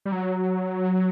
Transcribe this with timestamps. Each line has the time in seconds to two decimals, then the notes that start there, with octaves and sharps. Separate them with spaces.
0.05 G3
0.12 F#3